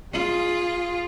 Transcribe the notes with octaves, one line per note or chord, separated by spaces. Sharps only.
F4 G#4